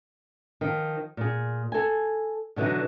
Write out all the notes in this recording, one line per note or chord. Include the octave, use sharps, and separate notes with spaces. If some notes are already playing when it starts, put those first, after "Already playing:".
D#3 F3
A#2 G#4
A4 G#5
B2 D3 E3 F#3 D#4